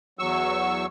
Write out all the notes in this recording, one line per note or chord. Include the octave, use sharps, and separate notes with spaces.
E2 F#3 C#6 E6